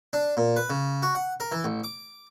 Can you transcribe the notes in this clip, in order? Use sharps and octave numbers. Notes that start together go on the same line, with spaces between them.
D4
A#2
B4
C#3
F#4
F#5
A#4
E3
A1
D6